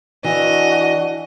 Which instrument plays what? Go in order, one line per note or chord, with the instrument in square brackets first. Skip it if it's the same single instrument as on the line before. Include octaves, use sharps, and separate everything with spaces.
[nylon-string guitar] E3 [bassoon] D4 [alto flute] F#4 [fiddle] D#5